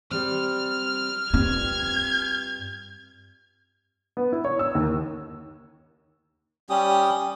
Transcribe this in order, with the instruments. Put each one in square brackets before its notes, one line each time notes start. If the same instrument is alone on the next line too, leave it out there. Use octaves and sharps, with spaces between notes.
[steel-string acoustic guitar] G3 C4 [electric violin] F6
[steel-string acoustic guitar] D2 G2 [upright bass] C4 F4 [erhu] G#6
[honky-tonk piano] B3
E4
C#5
E6
D#2
[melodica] G3 C#4 G4 D#6